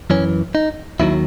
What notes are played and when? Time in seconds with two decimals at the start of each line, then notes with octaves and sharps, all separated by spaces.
0.10 F#2 E3 C#4
0.55 D#4
1.00 D#2 D#3 F#3 E4